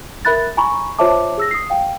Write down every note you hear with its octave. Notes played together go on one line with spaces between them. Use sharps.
A#4 E5 B5 F#6 A6
G#5 A#5 B5 C#6
F4 C5 C#5 E5 A5 D6
G#4 E6 A#6
D#6 C7
F5 G5